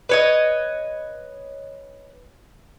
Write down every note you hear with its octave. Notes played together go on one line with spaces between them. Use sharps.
B4 C#5 D#5